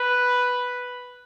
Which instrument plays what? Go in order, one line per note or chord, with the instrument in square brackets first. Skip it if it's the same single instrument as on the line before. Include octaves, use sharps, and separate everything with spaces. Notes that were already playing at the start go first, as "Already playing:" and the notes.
Already playing: [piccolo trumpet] B4